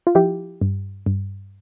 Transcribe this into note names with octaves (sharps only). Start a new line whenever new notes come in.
F4
F3 E4 G4
G2
G2